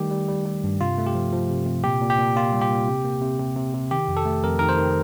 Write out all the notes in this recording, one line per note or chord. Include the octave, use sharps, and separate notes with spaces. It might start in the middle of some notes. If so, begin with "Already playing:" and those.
Already playing: D#3 G3 A3 G4
G3
G3
G3
G2
C3 F4
A3
G4
F3
F3
C3
C3
A#2 G4
A#2
G4
A#2
A#2 F4
G3
G4
A#3
C3
A#3
C3
C3
C3
C3
D#3 G4
F2
A4
A3
F2 A#4
D#3 A#4
C5
D#3